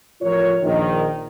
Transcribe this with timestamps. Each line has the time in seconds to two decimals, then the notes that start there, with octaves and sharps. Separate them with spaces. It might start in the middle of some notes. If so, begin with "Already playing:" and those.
0.21 A1 F3 F4 A#4 C#5
0.63 A#1 D#3